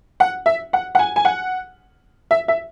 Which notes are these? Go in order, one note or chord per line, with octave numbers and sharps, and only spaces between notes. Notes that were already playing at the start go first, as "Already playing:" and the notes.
F#5
E5
F#5
F#5
G#5
G#5
F#5
E5
E5